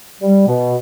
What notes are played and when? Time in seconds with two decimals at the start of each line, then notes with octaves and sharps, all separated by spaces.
0.21 G3
0.47 B2